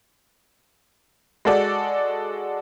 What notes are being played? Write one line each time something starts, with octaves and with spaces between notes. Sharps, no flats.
G#3 F#4 A4 D5